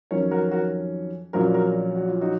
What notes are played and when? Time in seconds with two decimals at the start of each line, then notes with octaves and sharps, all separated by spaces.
0.11 F2 D#3 F#3 C#4 A#4 C#5
0.31 F#4 A#4
0.51 F#4 A#4
1.33 A#1 A#2 F#3 C#4 F#4 A#4
1.54 F#4 A#4
1.95 F#4
2.08 F4
2.21 D#4 F#4